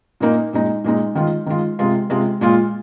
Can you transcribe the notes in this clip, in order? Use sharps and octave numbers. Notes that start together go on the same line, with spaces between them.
A#2 A#3 D#4
A#2 G#3 D#4
A#2 G#3 D#4
D#3 G#3 F4
D#3 G#3 F4
C3 G#3 F4
C3 G#3 F4
A#2 G#3 F4